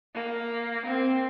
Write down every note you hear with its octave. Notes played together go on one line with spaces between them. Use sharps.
A#3
C4